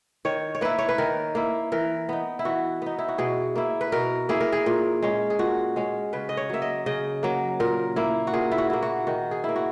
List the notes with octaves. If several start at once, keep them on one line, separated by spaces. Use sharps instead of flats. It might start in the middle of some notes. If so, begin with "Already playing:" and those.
D#3 C#5
C#5
A#3 E4 B4
C#5
B4
D#3 A#4
A#3 E4
E3 A#4
B3 D#4
E4
E3 F#4
B3 D#4
E4
F#4
B2 G#4
A#3 E4
B4
B2 A#4
A#3 E4 G#4
A#4
G#4
A#2
G#3 C#4
G#4
A#2 F#4
G#3 C#4
C#3 B4
D#5
C#5
F#3 A#3 E5
D#5
C#3 D#5
F#3 A#3
A#2 A#4
A#3 E4
F#4
A#2 G#4
E4
F#4
A#3 E4
F#4
D#3 F#4
G#4
A#3 E4
F#4